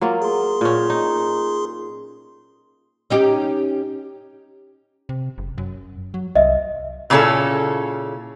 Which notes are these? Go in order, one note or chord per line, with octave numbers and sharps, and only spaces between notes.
F#3 A#3 F4
G#4 C6
A#2 C#4
D#4
C#4 D#4 G4
C3
F#1
F#2
F#3
C2 D#5 E5
A#2 C#3 A3 C#4 E4 A4